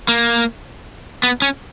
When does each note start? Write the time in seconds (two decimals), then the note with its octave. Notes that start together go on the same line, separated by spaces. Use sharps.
0.08 A#3
1.23 B3
1.42 C#4